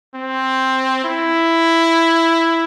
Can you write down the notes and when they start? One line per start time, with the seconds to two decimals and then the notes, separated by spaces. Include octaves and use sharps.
0.15 C4
1.04 E4